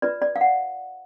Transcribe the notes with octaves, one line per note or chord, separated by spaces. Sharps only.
F4 B4 D5
D5
F5
F#5